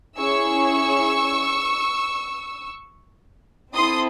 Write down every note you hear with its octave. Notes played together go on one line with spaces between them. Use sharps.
C#4 E4 G#4 C#6 E6
C4 E4 A4 C6 D#6